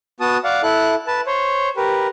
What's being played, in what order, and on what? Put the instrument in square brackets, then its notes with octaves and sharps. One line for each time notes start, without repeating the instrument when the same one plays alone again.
[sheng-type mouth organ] B3 F#4 A5 D#6
D5 F5 F#5
E4 A4 F#6
B4 A5
C5 C#5
G4 A#4 B4